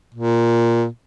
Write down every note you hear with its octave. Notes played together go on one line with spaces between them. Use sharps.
A#2